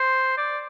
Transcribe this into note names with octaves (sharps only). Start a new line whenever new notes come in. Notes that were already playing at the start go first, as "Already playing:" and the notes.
Already playing: C5
D5